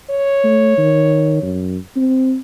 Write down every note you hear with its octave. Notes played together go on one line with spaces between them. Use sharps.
C#5
A3
D#3
F#2
C4